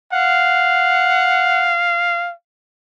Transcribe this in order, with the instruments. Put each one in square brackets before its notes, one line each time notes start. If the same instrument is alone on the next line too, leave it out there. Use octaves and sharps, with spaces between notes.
[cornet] F5 [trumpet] F#5